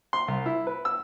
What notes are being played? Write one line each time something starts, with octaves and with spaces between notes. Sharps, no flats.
C6
C2
E4
B4
E6